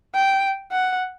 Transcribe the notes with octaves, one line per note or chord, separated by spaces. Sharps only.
G5
F#5